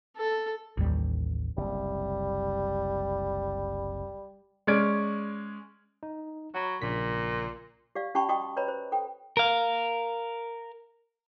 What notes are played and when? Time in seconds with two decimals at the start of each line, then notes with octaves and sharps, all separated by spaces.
0.17 A4
0.77 A1 D#2 G3
1.57 F#1 C2 G3
4.67 G#3 C#4 D5 F6 G#6 D7
6.03 D#4
6.54 F#3 F#5 B5
6.82 A#1 A#2 C#3 B6
7.95 G4 D5 F5
8.15 C#4 G4 G5 A5 B5 C#6
8.29 F#4 D#5 G5 C#6 D#6
8.57 B4 C#5 D#5 A#5 B5
8.68 C5
8.92 A4 G5
9.37 A#4 F5